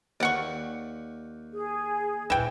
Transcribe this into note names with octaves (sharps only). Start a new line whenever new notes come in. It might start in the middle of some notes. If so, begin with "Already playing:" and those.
D#2 D5 F#5 C#6
G#4
D#2 A#2 E3 G5